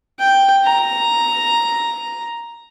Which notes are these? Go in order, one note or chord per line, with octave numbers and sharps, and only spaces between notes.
G5
A#5